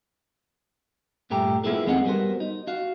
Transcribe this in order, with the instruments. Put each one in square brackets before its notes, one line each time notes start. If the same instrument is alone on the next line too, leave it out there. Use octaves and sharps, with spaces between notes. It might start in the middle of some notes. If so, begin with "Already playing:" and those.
[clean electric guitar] G2 A#2 A3 G4 A#5
A#3 B3 E4 F4 G#4 A4
E2 G#3 C4 D#4 D#5 F#5
G3 B3 F#4 A#4 C5
D#4
F#4 F5